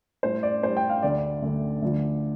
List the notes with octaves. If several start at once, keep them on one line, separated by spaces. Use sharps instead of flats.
A2 G3 C5
D5
A2 G3 C5
G5
F5
D2 D3 A3 D5
D2 D3 A3
D2 D3 F3